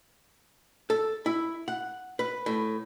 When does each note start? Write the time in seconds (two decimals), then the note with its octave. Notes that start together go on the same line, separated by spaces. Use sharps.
0.90 A4
1.26 E4
1.68 F#5
2.19 B4
2.46 A2